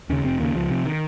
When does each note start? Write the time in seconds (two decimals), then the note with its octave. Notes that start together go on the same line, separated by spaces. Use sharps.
0.09 D#2 C#3 C#4
0.24 F1 C4
0.40 D#2 C#3 A#3
0.55 C#2 F3
0.71 C3
0.86 D#3